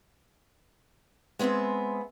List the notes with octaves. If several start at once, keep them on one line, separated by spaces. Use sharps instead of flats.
G#3 B3 C4 G#4 E5